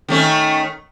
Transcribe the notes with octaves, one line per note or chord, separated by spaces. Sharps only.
D#3 A3 C#4